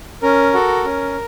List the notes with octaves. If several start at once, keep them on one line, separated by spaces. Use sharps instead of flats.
C#4 A#4
F#4 A4
C#4